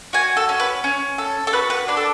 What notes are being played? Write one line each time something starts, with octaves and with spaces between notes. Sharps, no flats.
F#4 G#5
A4
C#4
B4
C#4
A4
A4
F#4 B4
B4
D4 B4
A4